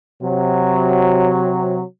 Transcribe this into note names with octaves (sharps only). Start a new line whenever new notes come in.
C3 F#3